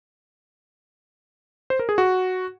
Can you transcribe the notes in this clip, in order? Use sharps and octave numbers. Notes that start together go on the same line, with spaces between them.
C5
A#4
G#4
F#4